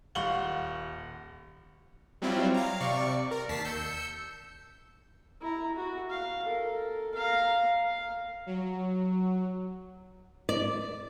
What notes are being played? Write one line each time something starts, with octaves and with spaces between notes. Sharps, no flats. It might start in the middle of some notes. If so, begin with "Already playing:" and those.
D#1 F5 F#5 C#6 F#7 G7
F#3 G3 C4 E4 F4
F5 A#5
C3 D5 C#6
A#4
D#2 A5 B6 C7
E6 G6 C#7
E4 A#5
F#4
F5
A4 A#4
F5 A#5
F5
F#3
D5